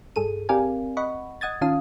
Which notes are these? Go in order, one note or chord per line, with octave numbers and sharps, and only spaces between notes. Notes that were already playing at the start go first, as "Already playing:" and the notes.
G2 G#4 A4 D#7
C4 G4 A#4 D5 F5 G#5
D#5 F#5 B5 C#6
D#5 F#5 D#6 G#6 A6
D#3 C#4 F4 F5 A5 D#6